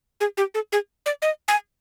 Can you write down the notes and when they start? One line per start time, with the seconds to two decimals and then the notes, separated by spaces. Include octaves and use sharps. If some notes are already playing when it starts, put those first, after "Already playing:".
0.20 G#4
0.37 G4
0.54 A4
0.72 G#4
1.06 D5
1.22 D#5
1.48 G#5